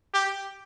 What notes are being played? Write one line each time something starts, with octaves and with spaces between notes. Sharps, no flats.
G4